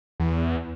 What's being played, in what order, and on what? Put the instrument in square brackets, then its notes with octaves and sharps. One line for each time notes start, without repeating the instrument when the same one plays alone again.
[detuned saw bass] E2